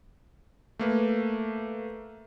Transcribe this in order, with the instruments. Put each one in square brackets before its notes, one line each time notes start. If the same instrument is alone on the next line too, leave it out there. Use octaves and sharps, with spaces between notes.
[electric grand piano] A3 A#3 B4